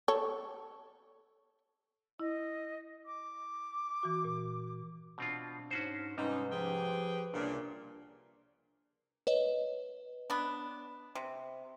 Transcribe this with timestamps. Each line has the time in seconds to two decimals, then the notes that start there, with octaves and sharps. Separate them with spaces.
0.08 A4 C#5
2.19 E4 D#5
3.05 D6
4.03 E3 F#4
4.24 A#2
5.18 B2 C4 D4 F4
5.71 G#2 C#4 F#4 C5
6.18 G#2 C3 G3 C#4 D#4 B4
6.51 F3 G4 G#4 G5
7.34 C2 A#2 C#3 D4
9.27 B4 C#5 D#5
10.30 B3 D4
11.15 C3